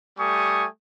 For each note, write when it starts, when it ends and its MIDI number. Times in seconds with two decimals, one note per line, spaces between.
0.19 0.66 55
0.19 0.66 57
0.19 0.66 80
0.19 0.66 85
0.19 0.66 87